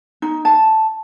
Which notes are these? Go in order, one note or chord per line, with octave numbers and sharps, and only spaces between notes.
D#4
A5